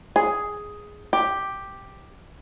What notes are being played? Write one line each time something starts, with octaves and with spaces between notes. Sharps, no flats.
G#4
G4